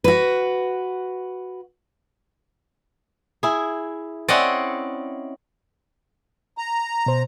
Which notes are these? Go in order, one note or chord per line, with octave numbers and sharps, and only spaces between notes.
F#4 B4
E4 G#4
C4 C#4 E4 D5 D#5 F#5
A#5
B2 C5